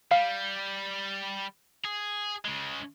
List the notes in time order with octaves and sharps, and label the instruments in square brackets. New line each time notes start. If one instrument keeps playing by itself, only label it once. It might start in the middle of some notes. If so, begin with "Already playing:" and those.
[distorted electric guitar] G3 [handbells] F5
[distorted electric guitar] G#4
C#3 G#3